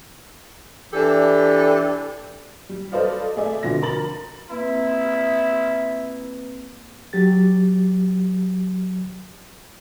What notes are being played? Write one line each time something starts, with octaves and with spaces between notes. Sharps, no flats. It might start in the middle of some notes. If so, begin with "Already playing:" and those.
E3 D4 E4 G4 A4
G3
A4 B4 C5 D5 D#5 F5
A3 G#4 D5 E5
B2 D3 F3 A#6
A#4 A#5 B5 A6 F#7
A#3 C4 E4 B4
F#3 G4 A6